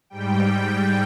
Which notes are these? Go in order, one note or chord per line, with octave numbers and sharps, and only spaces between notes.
G#2 G3 G5